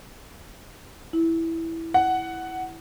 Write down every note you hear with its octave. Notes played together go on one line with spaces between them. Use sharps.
E4
F#5